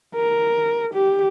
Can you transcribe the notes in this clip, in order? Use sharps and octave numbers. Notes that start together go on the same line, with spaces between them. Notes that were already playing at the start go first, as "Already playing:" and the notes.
A#4
G4